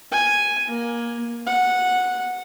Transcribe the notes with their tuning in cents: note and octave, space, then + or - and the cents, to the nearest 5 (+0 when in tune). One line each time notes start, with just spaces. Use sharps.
G#5 +0
A#3 +15
F#5 -10